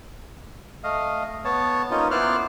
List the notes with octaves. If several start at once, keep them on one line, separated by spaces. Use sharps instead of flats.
A3 D#5 F5
B3 C#5 A5
A#3 C#4 D#4 F4
B3 E4 C5 D5 F6 F#6